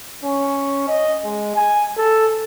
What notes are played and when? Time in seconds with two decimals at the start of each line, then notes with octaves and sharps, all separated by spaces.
0.24 C#4
0.88 D#5
1.24 G#3
1.56 G#5
1.97 A4